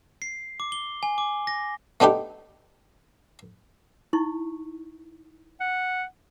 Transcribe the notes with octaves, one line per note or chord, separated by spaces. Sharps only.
C7
D6
G7
G#5
D6
A#6
A3 B3 D4 D#4 G4
D#4 E4 C#6
F#5